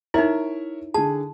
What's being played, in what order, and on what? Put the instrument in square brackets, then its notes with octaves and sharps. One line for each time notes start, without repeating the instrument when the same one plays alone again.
[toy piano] D#4 E4 [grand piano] A#4 C#5 E5
[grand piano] D3 G#4 [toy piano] A5